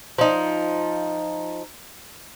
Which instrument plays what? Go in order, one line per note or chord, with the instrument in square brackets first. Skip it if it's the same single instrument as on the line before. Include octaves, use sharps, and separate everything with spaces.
[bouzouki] F3 D#4